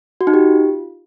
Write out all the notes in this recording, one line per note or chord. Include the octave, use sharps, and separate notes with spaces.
F#4
D#4
G4
F4